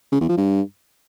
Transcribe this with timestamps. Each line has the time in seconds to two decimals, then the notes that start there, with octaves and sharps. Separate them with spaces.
0.12 C#3
0.21 E2
0.29 F3
0.37 G2